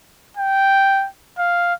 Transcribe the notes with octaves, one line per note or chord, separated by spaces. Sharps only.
G5
F5